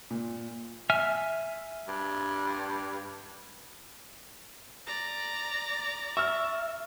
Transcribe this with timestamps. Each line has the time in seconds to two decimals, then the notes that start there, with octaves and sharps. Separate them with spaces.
0.10 A#2
0.90 E5 G#5 F6
1.88 G2
4.87 D5 A#5
6.17 E5 C#6 E6 F6